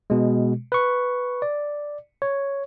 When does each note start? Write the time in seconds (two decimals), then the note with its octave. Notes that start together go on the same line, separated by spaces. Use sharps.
0.10 B2 G#3
0.72 B4 C#6
1.42 D5
2.22 C#5